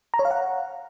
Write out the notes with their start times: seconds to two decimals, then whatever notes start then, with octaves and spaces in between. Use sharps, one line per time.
0.14 A#5
0.19 C#5
0.25 F5
0.31 F#5